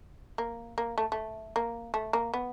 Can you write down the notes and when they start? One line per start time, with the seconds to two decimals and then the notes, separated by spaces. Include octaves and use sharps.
0.38 A#3
0.78 A#3
0.98 A3
1.12 A3
1.56 A#3
1.94 A3
2.13 A#3
2.34 B3